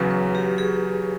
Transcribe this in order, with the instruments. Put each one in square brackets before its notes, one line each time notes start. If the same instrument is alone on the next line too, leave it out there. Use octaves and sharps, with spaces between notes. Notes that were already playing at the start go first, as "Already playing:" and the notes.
Already playing: [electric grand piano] E2 C#3 F#3 [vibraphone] B4
[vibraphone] B4
G4
G#4